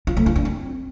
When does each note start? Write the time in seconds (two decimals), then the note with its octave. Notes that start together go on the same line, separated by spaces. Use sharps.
0.07 F4
0.17 A3
0.26 F4
0.36 D4
0.45 C4